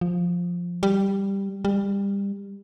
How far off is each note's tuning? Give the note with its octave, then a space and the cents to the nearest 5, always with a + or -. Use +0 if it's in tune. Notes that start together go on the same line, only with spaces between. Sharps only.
F3 +5
G3 +5
G3 +25